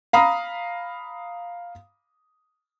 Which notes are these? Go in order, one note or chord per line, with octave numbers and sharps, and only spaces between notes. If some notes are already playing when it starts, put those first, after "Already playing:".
F5 A#5 B5 D#6